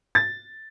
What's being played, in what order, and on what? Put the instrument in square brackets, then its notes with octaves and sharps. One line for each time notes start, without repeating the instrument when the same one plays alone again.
[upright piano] A6